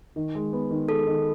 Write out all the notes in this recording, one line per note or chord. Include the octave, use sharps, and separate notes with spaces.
D#3
G#3
B3
D#3
G#3 A4
D#3